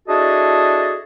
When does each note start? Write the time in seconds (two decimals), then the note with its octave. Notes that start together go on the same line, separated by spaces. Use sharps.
0.08 D4 E4 F#4 G#4 A4 D#5